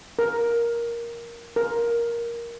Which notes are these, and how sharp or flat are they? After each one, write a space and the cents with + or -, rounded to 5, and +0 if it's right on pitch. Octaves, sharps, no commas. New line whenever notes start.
A#4 +10
A#4 +10